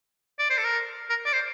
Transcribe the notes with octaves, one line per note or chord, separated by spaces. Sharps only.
D5
C5
A4
A#4
A#4
D5
C5